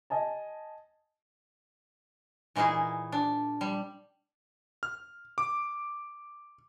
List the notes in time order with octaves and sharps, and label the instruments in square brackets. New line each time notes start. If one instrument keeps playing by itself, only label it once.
[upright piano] D#5 G#5 A5
[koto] A#2 E3 A#3 D#4 G#4
D4
G3
[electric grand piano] F6
D6